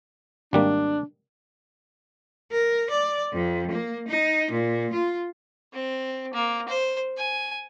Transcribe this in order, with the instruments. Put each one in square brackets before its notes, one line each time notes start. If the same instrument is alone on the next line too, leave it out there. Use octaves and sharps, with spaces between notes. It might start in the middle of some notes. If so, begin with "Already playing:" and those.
[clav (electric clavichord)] G#1 G3 A#3 [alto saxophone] D4
[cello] A#4
D5
F2
A#3
D#4
A#2
F4
[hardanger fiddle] C4
A#3
C5
G#5